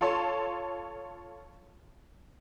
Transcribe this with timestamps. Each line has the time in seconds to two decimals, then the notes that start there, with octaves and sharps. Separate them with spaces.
0.01 F4 A4 C#5 A5 C6